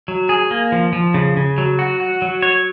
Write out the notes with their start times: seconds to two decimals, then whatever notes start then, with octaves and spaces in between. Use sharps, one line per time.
0.08 F#3
0.29 G#4
0.51 A#3
0.72 F3
0.93 F3
1.14 C#3
1.37 C#3
1.58 F#3
1.79 F#4
2.00 F#4
2.22 F#3
2.42 C#5